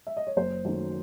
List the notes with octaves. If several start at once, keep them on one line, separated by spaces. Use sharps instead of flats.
E5
D#5
C#5
F#1 C5
F#2 D#3 A3